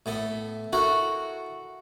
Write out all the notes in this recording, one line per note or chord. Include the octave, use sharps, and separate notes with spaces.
A2 B3 A4
E4 F#4 A4 A#4